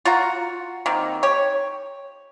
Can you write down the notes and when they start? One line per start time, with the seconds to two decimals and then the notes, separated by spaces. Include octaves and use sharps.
0.05 F4 F#4 A#5
0.86 D#3 A#3 C4
1.23 G4 C#5